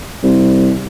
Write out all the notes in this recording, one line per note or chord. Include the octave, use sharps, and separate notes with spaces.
C2